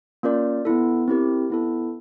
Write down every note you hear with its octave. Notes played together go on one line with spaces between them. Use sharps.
A#3 C#4 F4 A#4 D5
B3 E4 A4
C4 E4 G4 A#4
B3 E4 A4